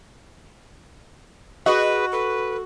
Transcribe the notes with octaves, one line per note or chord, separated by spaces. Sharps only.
F#4 G#4 B4 D#5
A4 B4